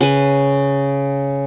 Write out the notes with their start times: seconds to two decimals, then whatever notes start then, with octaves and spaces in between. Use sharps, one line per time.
0.01 C#3 B4